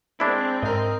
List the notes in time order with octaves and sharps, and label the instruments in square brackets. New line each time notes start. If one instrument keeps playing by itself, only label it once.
[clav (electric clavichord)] G#3 D4 E4 [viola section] C4
[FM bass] G#2 [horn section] A#4 D#5